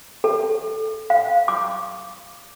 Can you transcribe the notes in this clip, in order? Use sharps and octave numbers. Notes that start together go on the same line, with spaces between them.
A4
F5
D6